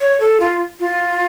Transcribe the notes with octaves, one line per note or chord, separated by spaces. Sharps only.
C#5
A4
F4
F4